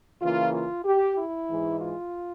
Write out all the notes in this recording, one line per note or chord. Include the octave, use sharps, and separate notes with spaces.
C#3 E3 A#3 F4
F4
G4
E4
G#2 E3 G#3
F4